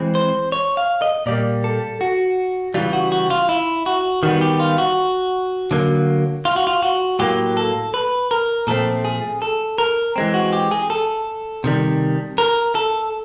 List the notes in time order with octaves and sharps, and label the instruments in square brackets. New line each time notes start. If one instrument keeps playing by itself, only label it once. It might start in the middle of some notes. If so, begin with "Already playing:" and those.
Already playing: [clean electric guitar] E3 G#3 C4
C5
C#5
F5
D#5
A#2 G3 A#3 D5
A4
F#4
C#3 E3 G3 F4
F#4
F#4
F4
E4
F#4
D#3 G3 B3 F#4
G4
F4
F#4
D3 F#3 A#3
F4
F#4
F4
F#4
A2 F#3 A#3 G4
A4
B4
A#4
A#2 F3 A3 C4 A4
G#4
A4
A#4
E3 G#3 C4
F#4
G4
G#4
A4
C3 D#3 G3
A#4
A4